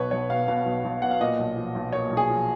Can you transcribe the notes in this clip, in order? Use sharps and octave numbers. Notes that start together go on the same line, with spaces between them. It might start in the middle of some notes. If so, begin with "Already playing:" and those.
Already playing: B1 B2 B4 C#5
B1 C#5
B2 F5
B2 F5
B1
B1
B2 F#5
F5
A#2 D#5
B1
F3
B1
A#2 C#5
B1
G#4
F3